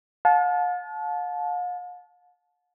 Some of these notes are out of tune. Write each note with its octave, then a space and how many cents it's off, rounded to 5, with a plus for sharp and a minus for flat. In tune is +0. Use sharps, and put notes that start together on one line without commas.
F5 +45 A5 -25